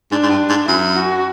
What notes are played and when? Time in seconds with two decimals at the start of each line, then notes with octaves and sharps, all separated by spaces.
0.11 G#2 D4
0.23 G#2
0.30 G2
0.49 G#2
0.68 F#2 E4
0.96 F#4